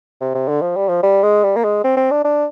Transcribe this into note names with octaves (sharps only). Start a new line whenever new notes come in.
C3
C3
D3
F3
G3
F3
G3
G#3
G3
A#3
G#3
C4
C4
D4
D4